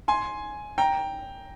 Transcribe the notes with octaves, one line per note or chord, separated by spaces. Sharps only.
G#5 C6
G5 A#5